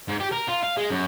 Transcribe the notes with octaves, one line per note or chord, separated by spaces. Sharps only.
G#2
G4
A#4
F4
F5
G#3
F#2